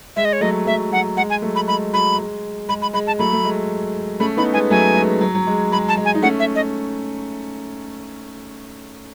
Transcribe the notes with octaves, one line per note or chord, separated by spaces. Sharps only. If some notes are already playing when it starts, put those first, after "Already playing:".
G#3 E5
D#5
C#5
F#3 A3 D#5
F#3 A3 E5
F#3 F#5
G#3 F#5
G#5
F#3 A3
B5
G#3 B5
F#3 B5
G#3
G#3 B5
B5
G#3 B5
A5
F#3 A3 B5
A3
G#3
A3 C#4 B5
B3 D#4 B5
G#3 B3 G#5
F#3 A3 G#5
G#3
F#3
F#3
G#3
G#3 B5
A5
G#3
G#5
D#4
A3 C#4 F#5
E5
D#5